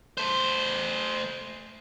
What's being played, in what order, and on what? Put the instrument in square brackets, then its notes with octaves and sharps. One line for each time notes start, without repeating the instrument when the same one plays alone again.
[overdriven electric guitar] A3 C5